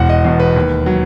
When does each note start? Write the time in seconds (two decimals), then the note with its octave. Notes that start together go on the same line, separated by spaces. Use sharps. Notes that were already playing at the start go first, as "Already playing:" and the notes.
Already playing: E1 F#5
0.09 D#5
0.25 E2 B2
0.40 B4
0.56 D#2
0.86 F#3